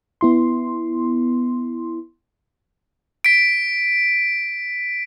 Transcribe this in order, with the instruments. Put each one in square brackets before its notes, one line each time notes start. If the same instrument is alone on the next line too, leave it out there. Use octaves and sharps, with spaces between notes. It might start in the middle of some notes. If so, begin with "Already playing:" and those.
[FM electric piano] B3 E4 C6
[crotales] B6 D7